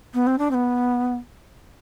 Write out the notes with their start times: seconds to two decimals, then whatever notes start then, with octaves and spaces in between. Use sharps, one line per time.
0.14 B3
0.26 C4
0.38 D4
0.50 C4
0.54 B3